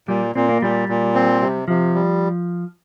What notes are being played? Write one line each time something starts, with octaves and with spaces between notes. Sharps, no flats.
A#2 G3
A#2 C4
A#3
A#2 G3
A#2
C4
C3
C3 F3
G3